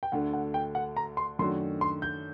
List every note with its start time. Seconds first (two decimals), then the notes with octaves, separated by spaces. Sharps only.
0.03 G5
0.12 D2 D3 A3 F#5
0.33 F#5
0.54 G5
0.75 F#5
0.97 A#5
1.17 C6
1.39 F#2 D#3 A3 D4 F#4 C6
1.81 C6
2.02 G6